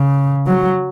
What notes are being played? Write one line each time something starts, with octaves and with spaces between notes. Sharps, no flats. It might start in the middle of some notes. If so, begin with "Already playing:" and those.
Already playing: C#3
F#3